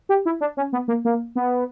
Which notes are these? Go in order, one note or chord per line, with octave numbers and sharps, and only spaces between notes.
G4
E4
D4
C#4
B3
A#3
A#3
B3